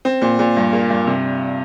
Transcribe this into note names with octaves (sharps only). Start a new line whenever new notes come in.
C4
A#2
A#2
G2
A#3
G2
C3